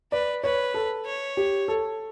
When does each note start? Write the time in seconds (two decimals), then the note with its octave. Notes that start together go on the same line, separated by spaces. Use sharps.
0.12 B4 D5
0.43 B4 C#5
0.74 A4
1.05 C#5
1.37 G4
1.68 A4